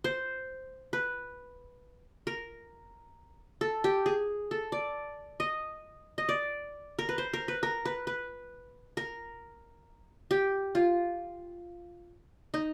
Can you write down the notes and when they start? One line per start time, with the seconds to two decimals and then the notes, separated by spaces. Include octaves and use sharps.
0.04 C5
0.93 B4
2.27 A#4
3.61 A4
3.84 G4
4.06 G#4
4.51 A4
4.72 D5
5.40 D#5
6.18 D#5
6.29 D5
6.99 A#4
7.09 B4
7.18 C5
7.33 A#4
7.48 B4
7.63 A#4
7.85 B4
8.07 B4
8.97 A#4
10.31 G4
10.75 F4
12.54 D#4